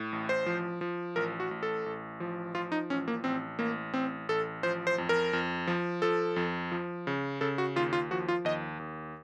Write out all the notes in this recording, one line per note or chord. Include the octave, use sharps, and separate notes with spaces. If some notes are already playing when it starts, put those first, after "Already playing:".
Already playing: A2
A1
C5
F3
F3
A1 A#4
F#4
A1
A4
A1
F3
F3 F4
D#4
A1 C#4
A#3
A1 C4
A1 A#3
A1 C4
A1 A4
F3 C5
C5
F2
A#4
F2
F3
F3 A4
F2
F3
C#3
C#3 A4
F#4
D#2 F4
F4
F3 F#4
F4
D#2 D#5
D#2